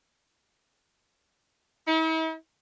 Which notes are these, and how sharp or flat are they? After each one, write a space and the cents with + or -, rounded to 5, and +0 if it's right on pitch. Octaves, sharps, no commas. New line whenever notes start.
E4 -45